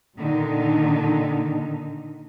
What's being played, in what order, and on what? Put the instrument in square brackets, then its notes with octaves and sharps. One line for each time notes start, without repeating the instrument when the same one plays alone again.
[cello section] A#2 D3 D#3 D#4